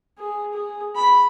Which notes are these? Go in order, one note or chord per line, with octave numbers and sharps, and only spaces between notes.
G#4
G#4
B5